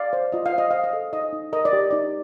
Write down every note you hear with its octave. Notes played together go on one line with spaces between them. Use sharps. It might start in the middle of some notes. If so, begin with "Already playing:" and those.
Already playing: D5 F5
C5
F4 D#5
F5
C5
D#5
C5 F5
D#5
A4
D#4 D#5
D#4
A#4 D#5
D5
G4
D#4 D5